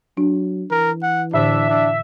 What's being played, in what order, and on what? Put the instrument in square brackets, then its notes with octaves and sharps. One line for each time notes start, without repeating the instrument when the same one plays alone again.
[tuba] F#3 [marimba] D4
[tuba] E3 [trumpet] A#4
[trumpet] F#5
[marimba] A2 D3 [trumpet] D4 [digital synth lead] E5
[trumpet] D4